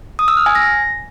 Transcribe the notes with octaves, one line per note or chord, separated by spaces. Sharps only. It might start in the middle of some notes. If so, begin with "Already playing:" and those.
D#6
E6
F6
G#5
A#6